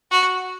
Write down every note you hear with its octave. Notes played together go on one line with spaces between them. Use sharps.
F#4